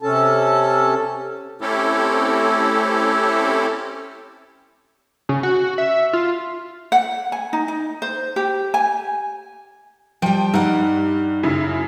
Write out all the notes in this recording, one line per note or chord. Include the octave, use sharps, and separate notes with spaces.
C3 C#4 A4 A5
A3 C4 C#4 E4 G4 A4
C#3
F#4
E5
F4
F#5
G#5
D#4
D#4
C5
G4
G#5
F3 G3 G5
G2 D#4 F#5
F#2 C#3 E4